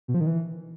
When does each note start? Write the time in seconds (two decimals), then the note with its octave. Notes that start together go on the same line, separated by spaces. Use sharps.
0.08 B2
0.14 F3
0.20 D#3
0.27 E3